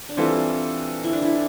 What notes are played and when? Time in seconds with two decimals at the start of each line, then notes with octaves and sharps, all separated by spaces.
0.09 D4
0.17 E3 G3 C4 E4 F4 A4
1.04 E4
1.13 D4
1.22 E4